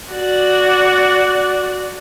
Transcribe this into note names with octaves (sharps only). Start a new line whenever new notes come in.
F#4 D5